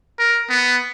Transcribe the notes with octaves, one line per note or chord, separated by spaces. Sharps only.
A#4
B3